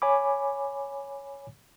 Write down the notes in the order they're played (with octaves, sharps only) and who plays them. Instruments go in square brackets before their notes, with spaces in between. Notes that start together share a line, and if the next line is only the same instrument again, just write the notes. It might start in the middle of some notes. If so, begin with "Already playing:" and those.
[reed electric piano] C#5 G#5 B5 D6